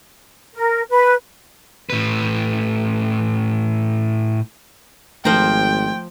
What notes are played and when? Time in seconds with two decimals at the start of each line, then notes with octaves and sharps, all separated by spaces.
0.54 A#4
0.89 B4
1.90 A2 B4
5.25 G#1 F3 A3 C5 G5 A#5